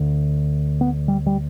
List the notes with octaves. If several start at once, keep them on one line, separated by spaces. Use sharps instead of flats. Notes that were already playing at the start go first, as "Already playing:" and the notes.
Already playing: D2 D3
B3
G3
G3